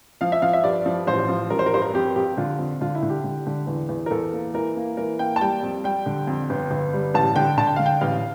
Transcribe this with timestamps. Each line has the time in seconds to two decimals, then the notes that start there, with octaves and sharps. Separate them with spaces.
0.21 F3 F5
0.32 E5
0.42 F3 F5
0.53 E5
0.64 G2 D5
0.86 F3
1.07 A1 C5
1.29 F3
1.50 A1 A#4
1.59 C5
1.66 A#4
1.73 G2 C5
1.82 A#4
1.94 F2 G4
2.16 F2 G4
2.37 D3 F4
2.59 F2
2.81 D3 F4
2.95 E4
3.03 D3
3.10 G4
3.24 D3
3.47 D3
3.67 E2
3.89 E2
4.06 A#4
4.11 E2 A4
4.32 A#3
4.54 E3 A#4
4.76 A#3
4.97 E3 A#4
5.19 A#3 G5
5.36 A5
5.41 G3 G5
5.63 F2
5.84 G3 G5
6.06 D3
6.27 F2
6.50 G1
6.71 G1
6.93 G3
7.14 A1 A5
7.36 D3 G5
7.57 D3 A5
7.67 G5
7.76 D3 F5
7.86 G5
8.01 A1 F5